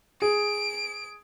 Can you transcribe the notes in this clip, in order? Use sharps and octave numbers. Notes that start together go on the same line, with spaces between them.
G#4 D7